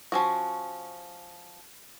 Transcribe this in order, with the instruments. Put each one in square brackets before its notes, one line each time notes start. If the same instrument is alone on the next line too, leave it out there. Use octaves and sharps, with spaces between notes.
[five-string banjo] F3 C#4 F#4